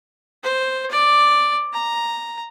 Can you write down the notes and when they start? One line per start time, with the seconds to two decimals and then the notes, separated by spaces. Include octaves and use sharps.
0.43 C5
0.91 D5
1.73 A#5